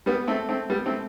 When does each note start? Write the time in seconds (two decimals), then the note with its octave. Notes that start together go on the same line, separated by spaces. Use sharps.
0.06 G3 B3
0.27 A3 C4
0.49 A3 C4
0.70 G3 B3
0.86 A3 C4